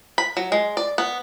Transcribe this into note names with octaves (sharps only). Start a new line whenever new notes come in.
B5
F#3
G#3
D5
B3